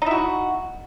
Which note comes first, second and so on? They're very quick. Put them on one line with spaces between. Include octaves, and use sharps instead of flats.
D#4 E4 F#4